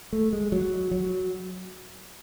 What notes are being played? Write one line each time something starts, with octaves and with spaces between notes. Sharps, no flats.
A3
G#3
F#3
F#3